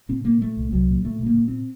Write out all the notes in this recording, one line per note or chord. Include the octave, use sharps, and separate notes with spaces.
A#2 C4
A#2 A#3
A#2 A3
C2
C2 F#3
A#2
A#2 A3
A#2
A#3
A#2
C4